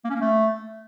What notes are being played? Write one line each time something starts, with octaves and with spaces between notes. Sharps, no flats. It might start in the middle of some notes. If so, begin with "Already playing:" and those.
A#3
C#4
A#3
A3